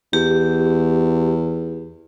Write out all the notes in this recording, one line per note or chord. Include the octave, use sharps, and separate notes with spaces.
E2 G4